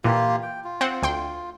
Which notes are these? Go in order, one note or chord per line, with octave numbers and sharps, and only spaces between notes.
A#2 E3 A#3 F4 G4
G5
F4
C4 C5 F#5
D2 G5 C6